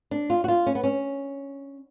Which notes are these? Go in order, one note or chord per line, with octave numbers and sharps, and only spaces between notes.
D4
F4
F#4
F4
C#4
B3
C#4